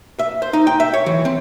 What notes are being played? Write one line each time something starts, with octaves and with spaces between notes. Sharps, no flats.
E5
C5
D#4
G5
E5
C#5
E3
C4